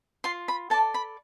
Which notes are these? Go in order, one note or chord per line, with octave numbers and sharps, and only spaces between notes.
F4 C6
B5
A4 D5 A5
B5